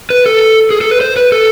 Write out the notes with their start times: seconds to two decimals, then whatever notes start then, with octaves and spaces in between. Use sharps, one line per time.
0.10 B4
0.26 A4
0.71 G#4
0.81 A4
0.91 B4
1.01 C5
1.17 B4
1.32 A4